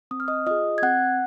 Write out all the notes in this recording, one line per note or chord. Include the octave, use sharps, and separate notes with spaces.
C4 D#6
F6
D#5 D#6
F4 G#4 D#5 D#6
G#6
C4 F#5 F#6